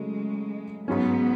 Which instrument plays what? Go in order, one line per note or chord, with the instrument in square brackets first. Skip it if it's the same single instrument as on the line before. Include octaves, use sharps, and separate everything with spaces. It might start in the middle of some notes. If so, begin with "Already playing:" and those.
Already playing: [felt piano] C#3 F#3 A3 C#4 [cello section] G#3
[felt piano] G#2 F#3 C#4 [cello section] B3